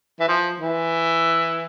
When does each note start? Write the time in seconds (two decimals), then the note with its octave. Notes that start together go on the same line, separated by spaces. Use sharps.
0.20 E3
0.28 F3
0.60 E3